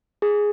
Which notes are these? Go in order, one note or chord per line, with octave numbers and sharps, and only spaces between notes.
G#4